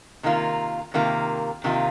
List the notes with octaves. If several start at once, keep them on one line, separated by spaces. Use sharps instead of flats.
C3 D#3 A#3 F4
C3 D#3 A#3 F4
C3 D#3 A#3 F4